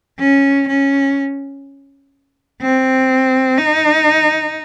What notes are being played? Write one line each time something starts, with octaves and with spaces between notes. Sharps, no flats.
C#4
C#4
C4
D#4